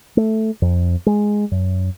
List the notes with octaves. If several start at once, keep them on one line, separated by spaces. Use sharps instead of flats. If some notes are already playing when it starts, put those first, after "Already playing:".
A3
F2
G#3
F#2